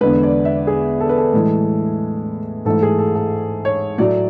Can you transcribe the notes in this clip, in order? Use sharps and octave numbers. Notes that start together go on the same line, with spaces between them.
E2 D3 G#3 B4
D5
E5
G#4
A4
B4
A4
A2 E3 G#3
G#2 E3 A3 A4
G#4
A4
A4
C#5
A2 F#3 A3 D5